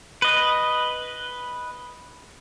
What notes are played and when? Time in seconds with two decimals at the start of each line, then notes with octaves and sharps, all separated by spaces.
0.22 B4 D#5